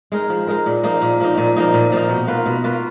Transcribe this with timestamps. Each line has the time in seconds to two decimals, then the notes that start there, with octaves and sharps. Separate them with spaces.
0.12 G#3 D#4 A#4
0.30 F3
0.47 G#3 D#4 A#4
0.66 A#2
0.83 F3 A#3 D#4
1.02 A#2
1.20 F3 A#3 D#4
1.37 A#2
1.56 F3 A#3 D#4
1.74 A#2
1.92 F3 A#3 D#4
2.09 B2
2.27 A#3 F4 B4
2.46 B2
2.64 A#3 F4 B4